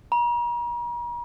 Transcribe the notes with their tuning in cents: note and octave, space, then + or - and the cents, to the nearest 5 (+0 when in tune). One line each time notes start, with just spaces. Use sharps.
A#5 +40